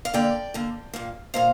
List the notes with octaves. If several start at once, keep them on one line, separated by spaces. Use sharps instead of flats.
F5
D3 A#3 D5 G5
D3 A#3
A#2 A#3
A#2 A#3 C5 F5